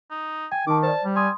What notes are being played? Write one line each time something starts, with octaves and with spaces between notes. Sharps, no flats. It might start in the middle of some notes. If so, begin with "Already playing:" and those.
D#4
G5 G#5
D#3 D#4 A5 D6
C5 D5 A5
G3
G#5 C6 D#6